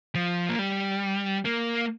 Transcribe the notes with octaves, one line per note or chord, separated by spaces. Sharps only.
F3
A#3
G3
A#3